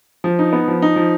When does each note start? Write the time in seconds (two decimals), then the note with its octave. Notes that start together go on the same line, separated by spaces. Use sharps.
0.24 F3
0.39 D#4
0.53 B3
0.68 F3
0.82 D#4
0.96 F3